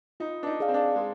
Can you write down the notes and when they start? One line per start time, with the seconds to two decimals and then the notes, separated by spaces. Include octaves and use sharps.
0.20 D#4 F4
0.43 D4
0.47 D#4
0.60 G#4 D5 F5
0.68 C4
0.74 D4
0.96 G#3